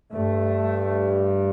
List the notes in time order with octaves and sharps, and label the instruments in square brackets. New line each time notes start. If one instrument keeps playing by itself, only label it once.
[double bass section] G2 A3